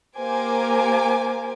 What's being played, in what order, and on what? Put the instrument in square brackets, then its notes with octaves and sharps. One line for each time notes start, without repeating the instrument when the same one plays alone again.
[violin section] A#3 G4 A#4 C5 G#5 D6